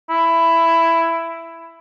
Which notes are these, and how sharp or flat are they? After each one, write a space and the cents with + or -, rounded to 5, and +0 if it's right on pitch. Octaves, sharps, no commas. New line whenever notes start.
E4 +10